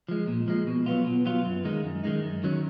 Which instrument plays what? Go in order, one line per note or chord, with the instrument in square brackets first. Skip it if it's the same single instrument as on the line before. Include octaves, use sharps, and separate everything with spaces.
[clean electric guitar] F3 G#3
A#2
F3 G#3
B2
F#3 B3 F4
B2
F#3 B3 F4
F#2
D#3 G#3 D#4
F#2
D#3 G#3 D#4
F#2
D#3 F#3 C#4